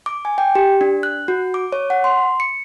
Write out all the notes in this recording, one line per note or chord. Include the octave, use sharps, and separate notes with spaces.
D6
G#5
G5
G4
D4
F#6
F#4
D6
C#5
F#5
C6
C#7